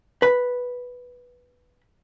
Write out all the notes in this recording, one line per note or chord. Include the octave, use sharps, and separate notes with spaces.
B4 B5